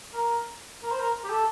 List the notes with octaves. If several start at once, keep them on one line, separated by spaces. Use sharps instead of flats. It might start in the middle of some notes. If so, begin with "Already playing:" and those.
A#4
A#4
C5
A#4
G4
A4